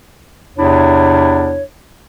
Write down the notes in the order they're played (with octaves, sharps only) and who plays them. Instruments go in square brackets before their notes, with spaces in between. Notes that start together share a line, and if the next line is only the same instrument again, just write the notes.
[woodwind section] E2 C3 D4 E4 C#5